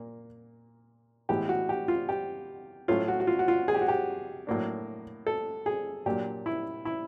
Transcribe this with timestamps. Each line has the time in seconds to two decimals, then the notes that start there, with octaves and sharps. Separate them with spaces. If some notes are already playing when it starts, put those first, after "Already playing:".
Already playing: A#2 A#3
1.29 A2 E3 G#3 B3 G4
1.49 F#4
1.69 G4
1.88 F4
2.09 G4
2.88 A2 F#3 A3 C#4 F4
3.08 F#4
3.20 F#4
3.27 F4
3.39 F#4
3.48 F4
3.68 G#4
3.74 G4
3.81 F#4
3.88 G4
4.47 A2 F#3 A#3 D4
5.27 A4
5.66 G#4
6.06 A#2 F#3 A#3 D4 G4
6.46 E4
6.85 E4